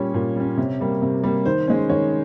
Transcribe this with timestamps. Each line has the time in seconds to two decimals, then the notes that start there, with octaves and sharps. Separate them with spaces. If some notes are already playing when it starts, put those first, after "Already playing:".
Already playing: A#2 G3 C#4 C#5
0.14 A#2
0.36 G3 C#4
0.57 C3
0.80 G3 A#3
1.02 C3
1.24 G3 A#3
1.45 D#3 C5
1.67 G#3 C#4
1.89 D#3 C#5